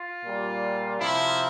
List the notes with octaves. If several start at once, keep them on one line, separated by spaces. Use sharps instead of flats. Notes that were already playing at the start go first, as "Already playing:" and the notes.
Already playing: F4
A#2 G3
C3 F3 E4